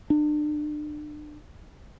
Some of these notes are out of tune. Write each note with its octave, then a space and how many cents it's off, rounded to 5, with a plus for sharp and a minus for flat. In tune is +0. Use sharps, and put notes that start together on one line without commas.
D4 +35